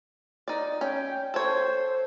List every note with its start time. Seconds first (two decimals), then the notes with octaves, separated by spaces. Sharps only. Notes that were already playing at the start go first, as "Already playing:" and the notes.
0.48 D#4 D5
0.81 C#4 G5
1.34 A4 C5 C#5